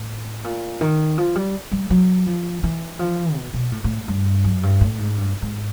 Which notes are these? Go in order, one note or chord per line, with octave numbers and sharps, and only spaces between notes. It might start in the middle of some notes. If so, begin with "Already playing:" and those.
Already playing: A2
A#2
D#3
F3
G3
G3
F#3
F3
E3
F3
B2
B2
A2
A2
G2
F#2
G2
A2
G#2
G2
G#2